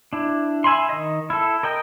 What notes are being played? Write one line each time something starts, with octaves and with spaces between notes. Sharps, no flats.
D4 E4
E5 G#5 B5 C6
D#3 D#5
E4 A4
A#4 D#5 G5